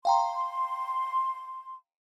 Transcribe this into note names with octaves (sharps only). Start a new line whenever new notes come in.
F5 G5 A#5 C6